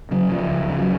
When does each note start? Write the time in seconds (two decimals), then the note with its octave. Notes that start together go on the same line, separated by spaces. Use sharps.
0.11 C#3 F#3
0.31 C#2 F3
0.50 C#2
0.70 C#3
0.78 F#3